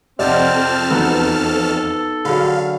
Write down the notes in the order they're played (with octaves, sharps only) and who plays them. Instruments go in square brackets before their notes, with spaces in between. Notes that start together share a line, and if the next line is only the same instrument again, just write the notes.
[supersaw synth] F2 A5 F6 [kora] C3 [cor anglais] C4 [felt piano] D5 D#5 F#5
[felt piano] E2 [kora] B3 D#4 F#4 [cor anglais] A4
[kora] D3 F#3 [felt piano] G4 G#4 B5 [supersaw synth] F5